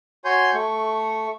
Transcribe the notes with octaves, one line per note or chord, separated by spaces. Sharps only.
F#4 C#5 G#5 C6 G6
A3 C#6